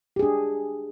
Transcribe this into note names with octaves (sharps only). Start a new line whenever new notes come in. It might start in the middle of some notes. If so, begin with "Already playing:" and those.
D4 G4 G#4